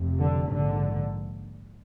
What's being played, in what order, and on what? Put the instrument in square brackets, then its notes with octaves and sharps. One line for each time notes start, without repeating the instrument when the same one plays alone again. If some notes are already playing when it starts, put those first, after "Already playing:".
Already playing: [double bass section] F1 F2 C3
D3
A#1 G#2 D3